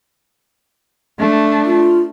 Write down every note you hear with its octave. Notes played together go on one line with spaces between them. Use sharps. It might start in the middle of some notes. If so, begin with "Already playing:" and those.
A3 D4
F4